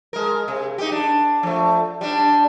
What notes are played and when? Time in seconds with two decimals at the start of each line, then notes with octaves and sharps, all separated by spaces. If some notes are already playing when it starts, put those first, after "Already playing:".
0.13 G#3 A#4
0.48 C3
0.78 D#4 G4
0.92 D4
1.43 F3 A3
2.01 G3 D4